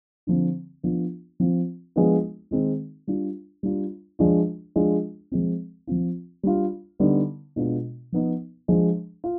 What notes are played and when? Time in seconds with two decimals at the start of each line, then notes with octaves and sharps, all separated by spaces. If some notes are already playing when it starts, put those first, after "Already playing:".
0.27 D3 F3 C4
0.83 F3 B3 D4 F4
1.40 F3 C4 F4
1.96 F3 G#3 B3 D4 F4
2.51 D#3 G#3 C4 D#4
3.07 G3 D4 F4
3.63 G3 D4 F4
4.19 F3 G#3 D4 F4
4.76 F3 G#3 D4 F4
5.32 F3 G#3 C4
5.87 F3 C4 F4
6.43 G3 D4 F4
7.00 D3 G3 B3 D#4
7.56 B2 G#3 B3 D4 F4
8.12 F3 B3 D#4
8.68 F3 G#3 D4
9.24 F4